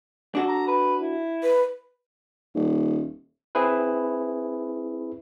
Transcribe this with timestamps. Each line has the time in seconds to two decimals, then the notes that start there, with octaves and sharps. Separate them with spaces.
0.35 D4 F#4 A4
0.49 A#5
0.67 B4
1.00 E4
1.43 B4
2.55 D#1
3.55 C4 E4 G#4 B4